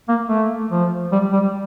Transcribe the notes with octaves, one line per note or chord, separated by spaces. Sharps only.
A#3
A3
F3
G3
G3